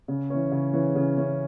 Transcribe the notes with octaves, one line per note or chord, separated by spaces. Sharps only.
C#3
E3 C#4
C#3
E3 C#4
C#3
E3 C#4